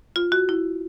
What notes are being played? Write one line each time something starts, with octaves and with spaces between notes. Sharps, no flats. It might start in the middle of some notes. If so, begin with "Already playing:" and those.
F4
F#4
E4